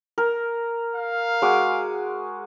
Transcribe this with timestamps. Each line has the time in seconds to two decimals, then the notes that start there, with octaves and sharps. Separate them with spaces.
0.18 A#4
0.96 F5
1.42 G#3 F#4 D6